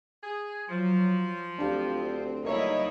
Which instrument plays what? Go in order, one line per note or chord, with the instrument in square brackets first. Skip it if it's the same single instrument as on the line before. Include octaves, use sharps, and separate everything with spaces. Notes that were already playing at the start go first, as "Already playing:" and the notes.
[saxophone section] G#4
[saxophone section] F3 [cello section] F#3
[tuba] D2 [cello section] C4 [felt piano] D4 G4 F5
[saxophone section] D#2 C#5 [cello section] G3 D#4 E4 [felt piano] A#3 E5